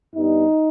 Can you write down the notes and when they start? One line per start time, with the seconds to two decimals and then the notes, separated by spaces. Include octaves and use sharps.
0.15 G2 G3 B3 D#4